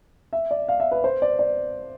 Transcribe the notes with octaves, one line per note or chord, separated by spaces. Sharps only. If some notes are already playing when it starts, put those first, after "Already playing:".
E5
D5
F5
E5
B4
C5
D5
D5